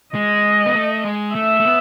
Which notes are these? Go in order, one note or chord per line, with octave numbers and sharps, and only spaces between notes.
G#3 D#5
B3
A3
G#3
A3 E5
A3
B3